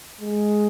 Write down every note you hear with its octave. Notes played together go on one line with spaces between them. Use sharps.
G#3